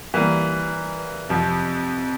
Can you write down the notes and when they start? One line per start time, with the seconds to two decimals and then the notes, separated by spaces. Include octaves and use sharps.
0.14 E3 G3 A#3
1.29 F2 C3 F3